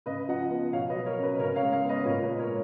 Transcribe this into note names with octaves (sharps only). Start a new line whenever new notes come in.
C#3 B4 D#5
F3 D#5 F#5
B3
B2 C#5 F5
B4 D#5
F#3
A#4 C#5
C#4
B4
C#3 A#4 C#5
C#5 F5
G#3
C#5 F5
B3
B4 D#5
A#2 A#4 C#5
B4
G#3
A#4 C#5